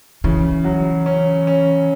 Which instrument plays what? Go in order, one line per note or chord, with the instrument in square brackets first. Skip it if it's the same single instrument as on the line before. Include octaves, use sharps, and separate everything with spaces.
[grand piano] C#3 [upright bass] E3
[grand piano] F#3
C#4
C#4